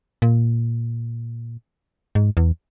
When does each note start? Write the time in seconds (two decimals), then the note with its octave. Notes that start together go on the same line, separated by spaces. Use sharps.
0.22 A#2
2.15 G#2
2.37 E2